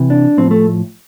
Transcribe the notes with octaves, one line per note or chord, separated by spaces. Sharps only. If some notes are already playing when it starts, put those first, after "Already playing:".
Already playing: C3 E3
D4
A2 F3 C4
A3